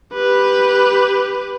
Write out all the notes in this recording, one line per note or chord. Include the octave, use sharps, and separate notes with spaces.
G4 B4